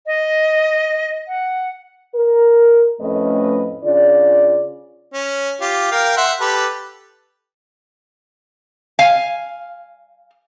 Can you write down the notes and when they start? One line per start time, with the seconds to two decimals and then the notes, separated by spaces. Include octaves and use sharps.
0.07 D#5
1.28 F#5
2.15 A#4
3.00 F2 A2 A3 C#4 B4 D#5
3.83 C#3 D4 F4 D5
5.14 C#4
5.61 F4 G4
5.92 A#4 F5 G5
6.17 E5 F#5 C6
6.41 G4 A4 B4
8.99 F5 G#5